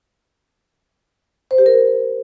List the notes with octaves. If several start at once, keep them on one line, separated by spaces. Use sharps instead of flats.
C5
G4
A#4